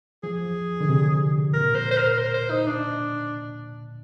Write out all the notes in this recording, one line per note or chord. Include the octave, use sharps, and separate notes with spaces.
F3 G#4
D3
C3
A#2 A#4
C5
C5
A#4
C5
C5
D#4
D4